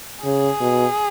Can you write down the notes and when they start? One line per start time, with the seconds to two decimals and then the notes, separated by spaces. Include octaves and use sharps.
0.24 C#3 G#4
0.60 B2